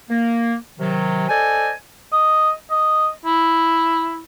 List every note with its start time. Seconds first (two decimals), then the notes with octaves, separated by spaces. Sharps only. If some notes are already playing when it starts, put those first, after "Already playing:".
0.10 A#3
0.80 C3 D#3 F#3
1.29 A4 C5 D5 D#5 G#5
2.13 D#5
2.70 D#5
3.25 E4